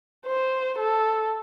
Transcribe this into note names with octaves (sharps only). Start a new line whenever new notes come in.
C5
A4